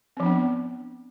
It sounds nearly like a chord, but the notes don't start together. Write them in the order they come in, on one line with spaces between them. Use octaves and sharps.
C4 F3 D4 B3